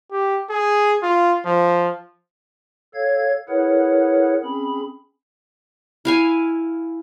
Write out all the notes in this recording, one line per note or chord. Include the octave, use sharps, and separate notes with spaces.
G4
G#4
F4
F3
A4 C#5 F5 G#6
E4 G#4 A#4 B4 C#5 F#5
C4 C#4 G#4 B5
E4 F5 G#5